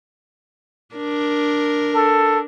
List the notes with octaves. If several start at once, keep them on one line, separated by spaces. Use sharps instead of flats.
D4 A#4
A4